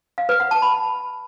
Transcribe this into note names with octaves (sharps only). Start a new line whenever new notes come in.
F5
B4
F#5
A5
B5